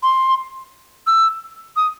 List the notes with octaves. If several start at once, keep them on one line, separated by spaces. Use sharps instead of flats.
C6
E6
D#6